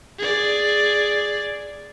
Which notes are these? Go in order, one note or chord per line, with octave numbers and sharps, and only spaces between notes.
G#4 D5